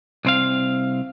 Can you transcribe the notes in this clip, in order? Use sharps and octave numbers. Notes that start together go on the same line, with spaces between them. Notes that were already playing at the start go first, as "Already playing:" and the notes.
C2 C4 F5